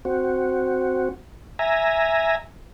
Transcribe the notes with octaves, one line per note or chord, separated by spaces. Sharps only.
C4 F#4
E5 G#5 A#5